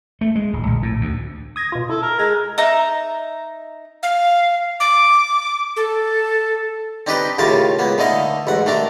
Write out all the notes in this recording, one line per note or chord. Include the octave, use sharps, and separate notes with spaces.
A3
G#3
D1
A#1
A2
D2
D#6 G#6 A#6
B2 F4
E4 A4
A#4
G#3 A#5 G#6 A#6
D#4 E5 A#5
F5
D6
A4
C4 D4 D#4 G4 B4 D#5
D#2 A2 C#3 F4 A#4 A5
C#2 A#3 B3
D3 A3 D#4 D#5 F5
A1 G#2 F#5
D#3 A3 D4 A#5